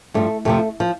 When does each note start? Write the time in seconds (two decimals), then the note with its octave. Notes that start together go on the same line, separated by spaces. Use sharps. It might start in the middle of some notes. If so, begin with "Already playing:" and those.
0.14 G2 F3 A3
0.45 F2 C3 F3 A3
0.80 F3